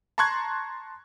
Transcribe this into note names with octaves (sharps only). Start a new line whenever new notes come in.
A5 A#5 C6 C#6 F#6 G#6